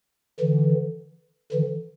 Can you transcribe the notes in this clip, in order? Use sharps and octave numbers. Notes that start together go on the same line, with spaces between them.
D3 E3
D3 E3